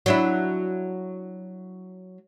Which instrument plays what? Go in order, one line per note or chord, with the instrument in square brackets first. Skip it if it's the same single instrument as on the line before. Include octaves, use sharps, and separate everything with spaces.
[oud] F#3 D4 E4